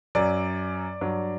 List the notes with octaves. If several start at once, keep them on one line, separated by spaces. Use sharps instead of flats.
F#2 F#3 D5
G2 F#3